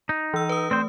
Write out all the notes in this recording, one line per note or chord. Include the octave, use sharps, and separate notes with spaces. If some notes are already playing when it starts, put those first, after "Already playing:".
D#4
E3 E6
B4 D#6
A3 C4 C5